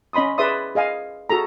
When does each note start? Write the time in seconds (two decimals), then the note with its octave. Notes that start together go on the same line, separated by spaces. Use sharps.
0.13 C#4 D#5 B5 C6 D#6
0.38 G#4 B4 D5 E5 C6 D#6
0.75 G#4 D#5 F5 G#5
1.29 F#4 G#4 A4 A#5